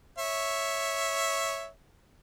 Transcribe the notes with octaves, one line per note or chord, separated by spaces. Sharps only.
C#5 E5